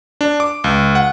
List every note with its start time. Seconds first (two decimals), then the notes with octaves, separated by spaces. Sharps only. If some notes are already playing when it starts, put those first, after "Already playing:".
0.21 D4
0.40 D6
0.64 C#2
0.95 F#5